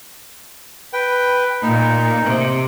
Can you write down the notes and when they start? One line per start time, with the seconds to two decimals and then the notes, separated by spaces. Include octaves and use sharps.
0.93 B4 G5
1.62 A#2 D#4
2.25 C3